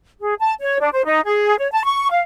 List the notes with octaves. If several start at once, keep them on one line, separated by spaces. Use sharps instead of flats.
G#4
A5
C#5
D4
C5
D#4
G#4
C#5
A5
C#6
F5